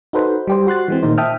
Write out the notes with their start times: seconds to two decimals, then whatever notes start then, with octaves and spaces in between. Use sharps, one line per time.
0.13 D#4 F#4 A4 B4 C5
0.47 G3 G4 C5
0.67 F#4 C6 F#6 A6
0.88 E3 G#3 C4
1.03 A#2 D#3 D#4 C5
1.18 E5 G5 A5 D#6 F6